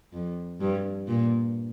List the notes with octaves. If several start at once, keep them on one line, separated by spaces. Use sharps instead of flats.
F2
G2
A#2